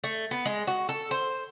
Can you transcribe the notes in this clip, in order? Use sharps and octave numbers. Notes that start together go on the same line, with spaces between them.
A3
B3
G#3
F#4
A4
C5